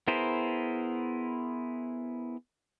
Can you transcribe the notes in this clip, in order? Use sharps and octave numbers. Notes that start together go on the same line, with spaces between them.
B3 E4 G#4 A#4 C5